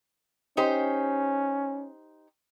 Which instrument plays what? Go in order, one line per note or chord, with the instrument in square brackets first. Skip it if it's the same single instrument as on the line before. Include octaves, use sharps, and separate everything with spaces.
[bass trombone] C#4 [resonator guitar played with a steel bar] D#4 G4 C5